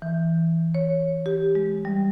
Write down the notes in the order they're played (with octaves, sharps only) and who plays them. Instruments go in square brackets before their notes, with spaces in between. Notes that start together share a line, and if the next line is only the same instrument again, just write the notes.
[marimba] E3
C#5
G4
G#3
G3